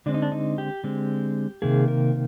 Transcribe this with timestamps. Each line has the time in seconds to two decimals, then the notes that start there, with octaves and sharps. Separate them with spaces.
0.06 D3 G#3 C4 D4
0.14 D#4
0.22 D4
0.32 D#4
0.58 G4
0.84 D3 G#3 C4
1.62 C3 D#3 A#3 G#4
1.88 A#4